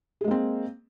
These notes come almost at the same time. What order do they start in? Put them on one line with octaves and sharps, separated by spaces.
G#4 G#3 A#3 C4